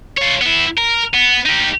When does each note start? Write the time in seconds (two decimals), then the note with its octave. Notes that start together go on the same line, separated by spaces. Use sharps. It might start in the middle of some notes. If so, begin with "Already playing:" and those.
0.18 F4 C#5
0.41 B3 E4
0.77 A#4
1.14 B3
1.45 D#4 G4